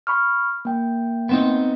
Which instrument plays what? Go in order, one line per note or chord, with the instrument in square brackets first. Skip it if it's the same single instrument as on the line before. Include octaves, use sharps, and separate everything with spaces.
[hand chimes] B5 C#6 F6
A#3 G5
[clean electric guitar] B3 C4 D#4